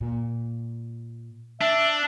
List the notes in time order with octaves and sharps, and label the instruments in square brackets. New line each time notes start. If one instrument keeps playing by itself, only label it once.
[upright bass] A#2
[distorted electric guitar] D4 [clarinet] E5